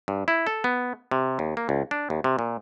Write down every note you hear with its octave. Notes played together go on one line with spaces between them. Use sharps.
G2
E4
A4
B3
C3
D#2
A#3
C#2
D4
D#2
C3
A#2